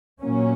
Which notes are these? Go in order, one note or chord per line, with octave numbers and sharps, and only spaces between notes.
A#2 F#3 A#3 C#4